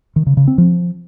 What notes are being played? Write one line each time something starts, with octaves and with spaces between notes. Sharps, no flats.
D#3
C#3
C#3
C4
F3